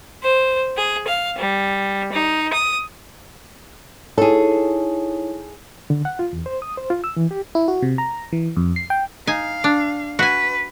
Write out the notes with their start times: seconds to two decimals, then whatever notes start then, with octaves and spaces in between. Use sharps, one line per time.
0.23 C5
0.77 G#4
1.07 F5
1.37 G3
2.13 D#4
2.53 D#6
4.18 D#4 E4 G#4 A4 C#5
5.90 D3
6.05 F#5
6.19 F4
6.33 E2
6.46 C5
6.62 D#6
6.77 C5
6.90 F4
7.04 E6
7.16 E3
7.31 G4
7.55 E4
7.68 F#4
7.82 C3
7.98 A#5
8.32 E3
8.56 F2
8.76 C7
8.90 G5
9.27 D#4 F5 G#5
9.64 D4
10.19 F#4 B4 G#5